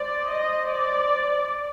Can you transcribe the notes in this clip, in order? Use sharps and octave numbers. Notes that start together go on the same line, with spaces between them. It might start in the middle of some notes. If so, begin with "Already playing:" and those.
Already playing: C5 D5
D#5
D5